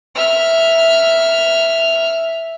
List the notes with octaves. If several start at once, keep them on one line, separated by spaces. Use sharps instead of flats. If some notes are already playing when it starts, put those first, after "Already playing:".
E5 F6